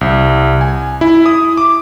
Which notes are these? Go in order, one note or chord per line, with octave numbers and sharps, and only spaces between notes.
C2
G#5
E4
D#6
D6